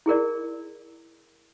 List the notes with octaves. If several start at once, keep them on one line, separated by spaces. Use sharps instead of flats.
E4 G#4 A#4 D5